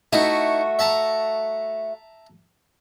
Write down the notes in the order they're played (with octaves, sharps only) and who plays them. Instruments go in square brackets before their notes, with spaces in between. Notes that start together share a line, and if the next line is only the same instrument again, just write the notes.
[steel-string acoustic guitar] A3 F#4 [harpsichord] D#4 E4
[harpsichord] E5 A5 A#5